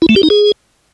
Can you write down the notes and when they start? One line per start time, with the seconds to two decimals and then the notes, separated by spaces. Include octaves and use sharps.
0.02 E4
0.09 A3
0.16 G4
0.23 D#4
0.30 G#4